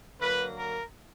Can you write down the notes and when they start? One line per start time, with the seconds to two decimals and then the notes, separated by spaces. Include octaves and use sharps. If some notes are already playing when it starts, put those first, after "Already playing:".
0.20 D3 F#3 A#3 B4
0.56 A#4